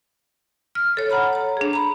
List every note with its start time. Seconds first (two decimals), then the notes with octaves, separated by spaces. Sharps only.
0.75 F6
0.97 A4 C#5
1.10 F#5 A#5 B5 F6
1.33 C#5 A#5
1.57 D4 G#4
1.73 A#5 B5